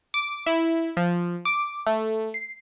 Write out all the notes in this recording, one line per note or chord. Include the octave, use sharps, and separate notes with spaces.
D6
E4
F3
D6
A3
C7